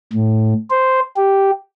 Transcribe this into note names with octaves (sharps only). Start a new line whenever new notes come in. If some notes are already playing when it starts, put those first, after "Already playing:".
A2
C5
G4